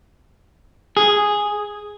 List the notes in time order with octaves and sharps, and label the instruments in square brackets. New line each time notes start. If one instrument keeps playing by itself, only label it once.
[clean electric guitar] G#4